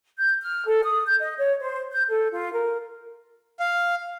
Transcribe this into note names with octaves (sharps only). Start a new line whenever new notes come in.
G6
F6
A4
D#6
G6
D#5
C#5
C5
G6
A4
F4
A#4
F5